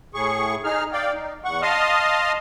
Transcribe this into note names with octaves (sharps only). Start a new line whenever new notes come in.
A2 G#4 C#6
D#4 G#4 F6
D5 F5 G5
D#4
E2 F#5 C#6
D#5 F5 A5 C6 D#6 F6